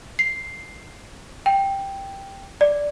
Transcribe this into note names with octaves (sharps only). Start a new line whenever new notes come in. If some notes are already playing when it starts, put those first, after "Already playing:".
C7
G5
D5